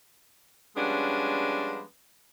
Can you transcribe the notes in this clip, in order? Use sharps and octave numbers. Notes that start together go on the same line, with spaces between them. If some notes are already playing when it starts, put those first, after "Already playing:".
F3 G3 G#3 B3 C#4 D4